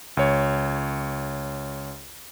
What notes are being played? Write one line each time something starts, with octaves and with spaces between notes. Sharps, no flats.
C#2 C#5